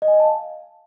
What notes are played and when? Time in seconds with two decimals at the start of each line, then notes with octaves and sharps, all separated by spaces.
0.02 D#5
0.08 G#5
0.14 D#5
0.20 A5
0.26 F5